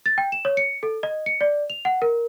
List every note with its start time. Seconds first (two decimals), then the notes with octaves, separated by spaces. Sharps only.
0.06 A6
0.18 G5
0.32 E7
0.45 C#5
0.57 C#7
0.83 A4
1.03 D#5
1.26 C#7
1.41 D5
1.70 F7
1.85 F#5
2.02 A#4